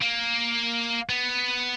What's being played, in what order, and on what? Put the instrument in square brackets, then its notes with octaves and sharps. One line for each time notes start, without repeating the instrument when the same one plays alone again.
[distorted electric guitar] A#3
B3